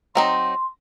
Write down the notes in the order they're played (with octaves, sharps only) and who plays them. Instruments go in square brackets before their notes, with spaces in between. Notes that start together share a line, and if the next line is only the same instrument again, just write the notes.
[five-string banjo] F#3 C4 D#4 [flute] C6